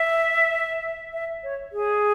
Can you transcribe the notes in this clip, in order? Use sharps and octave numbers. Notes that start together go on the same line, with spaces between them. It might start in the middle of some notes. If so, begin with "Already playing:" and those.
Already playing: E5
E5
C#5
G#4